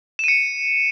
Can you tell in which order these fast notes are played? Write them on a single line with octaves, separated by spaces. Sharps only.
E7 D#7 C#7